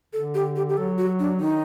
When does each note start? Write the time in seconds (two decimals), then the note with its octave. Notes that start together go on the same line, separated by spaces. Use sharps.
0.13 D3 A4
0.34 G4
0.56 G4
0.69 G4
0.77 F#3 A4
0.98 F#4
1.19 D4
1.40 D#3 D#4